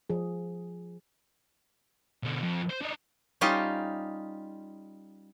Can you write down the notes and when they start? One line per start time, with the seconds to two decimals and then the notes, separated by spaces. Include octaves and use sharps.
0.10 F3 G#4
2.23 B2 D3
2.43 F2
2.70 C5
2.82 D4 D#4
3.41 G3 C#4 D#4 F4 G4 D#5